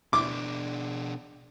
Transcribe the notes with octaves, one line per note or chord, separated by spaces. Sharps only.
B2 D4 D6